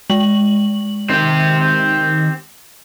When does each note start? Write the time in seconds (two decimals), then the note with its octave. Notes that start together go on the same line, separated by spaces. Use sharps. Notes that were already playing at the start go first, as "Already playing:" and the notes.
0.10 G#3 F#7
1.10 D#3 C4 G4